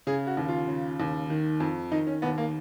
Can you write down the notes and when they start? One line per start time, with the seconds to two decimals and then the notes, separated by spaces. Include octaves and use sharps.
0.07 C#3 G#4
0.27 F#4
0.37 D#2
0.49 F4
0.68 C#3
1.00 D#2
1.30 D#3
1.60 F2
1.91 D#3 D#4
2.07 C#4
2.22 D#2 B3
2.38 A#3